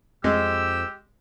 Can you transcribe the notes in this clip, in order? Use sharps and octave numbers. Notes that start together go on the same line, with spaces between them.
F2 G#3 G4 E6